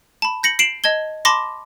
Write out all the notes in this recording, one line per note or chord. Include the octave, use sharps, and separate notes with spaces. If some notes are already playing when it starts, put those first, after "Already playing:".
A5 B5
G6 A#6 C#7 F#7
C7 D7 E7 F#7
D#5 A5 G#6 G7
A5 B5 C6 D6 A#6